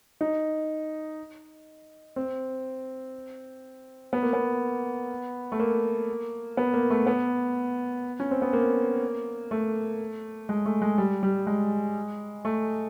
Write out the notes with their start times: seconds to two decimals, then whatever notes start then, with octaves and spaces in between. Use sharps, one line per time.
0.21 D#4
2.16 C4
4.13 B3
4.23 A#3
4.33 B3
5.52 A3
5.60 A#3
6.57 B3
6.74 A#3
6.90 A3
7.07 B3
8.20 C#4
8.31 C4
8.42 B3
8.53 A#3
9.51 A3
10.49 G#3
10.66 A3
10.82 G#3
10.98 G3
11.23 G3
11.47 G#3
12.45 A3